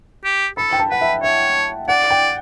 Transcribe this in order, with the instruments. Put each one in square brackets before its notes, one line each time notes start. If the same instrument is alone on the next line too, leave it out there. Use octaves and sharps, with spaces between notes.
[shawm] G4
[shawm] A4 [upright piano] B5
[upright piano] G5
A5
[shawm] B4 [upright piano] F#5
[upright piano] E5
[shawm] C#5 [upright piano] E5
[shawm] D5 [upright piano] F#5
[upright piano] G5